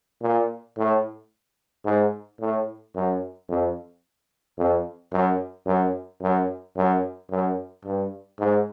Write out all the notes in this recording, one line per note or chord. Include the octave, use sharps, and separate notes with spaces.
A#2
A2
G#2
A2
F#2
F2
F2
F#2
F#2
F#2
F#2
F#2
G2
G#2